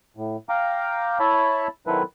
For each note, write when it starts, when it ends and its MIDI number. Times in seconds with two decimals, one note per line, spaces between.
0.17 0.36 45
0.49 1.18 77
0.49 1.18 79
0.49 1.18 82
0.49 1.18 86
1.20 1.68 64
1.20 1.68 73
1.20 1.68 76
1.20 1.68 81
1.20 1.68 83
1.87 2.03 51
1.87 2.03 54
1.87 2.03 60
1.87 2.03 64
1.87 2.03 69
1.87 2.03 71